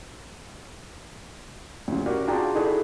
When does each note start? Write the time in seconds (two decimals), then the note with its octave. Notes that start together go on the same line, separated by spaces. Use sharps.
1.88 D2 C#3
2.06 F#4 G4 A#4 D5 F#5
2.28 D4 F4 F#4 G#4 G5 A#5
2.55 D#4 E4 F#4 G#4 A4 D5